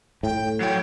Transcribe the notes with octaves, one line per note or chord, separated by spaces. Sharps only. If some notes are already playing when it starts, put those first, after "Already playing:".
A2 G5
F#3 C#5 G5